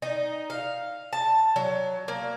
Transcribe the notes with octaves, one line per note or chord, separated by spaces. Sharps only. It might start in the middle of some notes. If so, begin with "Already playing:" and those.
D#4
F5
A5
F#3
A#3